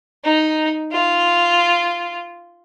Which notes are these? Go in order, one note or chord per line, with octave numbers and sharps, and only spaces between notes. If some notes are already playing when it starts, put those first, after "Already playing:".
D#4
F4